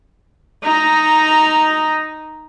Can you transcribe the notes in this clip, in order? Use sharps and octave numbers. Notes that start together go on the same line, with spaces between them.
D#4 A#5